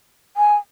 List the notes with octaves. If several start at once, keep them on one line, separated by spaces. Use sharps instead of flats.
G#5